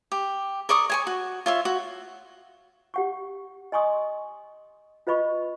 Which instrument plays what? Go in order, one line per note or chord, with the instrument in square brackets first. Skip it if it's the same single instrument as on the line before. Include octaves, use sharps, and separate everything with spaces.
[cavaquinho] G4
A#4 D5 C#6 D#6
C#5 G#5 C#6
F#4
F4 C#5 E5
F#4
[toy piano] G4 F#5 C#6
D#5 G#5 C6 C#6 D#6
F4 B4 D#5 B5 C#6